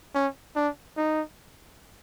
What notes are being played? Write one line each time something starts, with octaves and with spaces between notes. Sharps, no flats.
C#4
D4
D#4